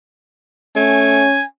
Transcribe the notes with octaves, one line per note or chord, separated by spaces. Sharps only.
A3 C#4 G#5